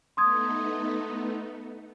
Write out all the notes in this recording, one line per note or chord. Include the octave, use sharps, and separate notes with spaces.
A3 B3 D#4 C6 D#6 G#6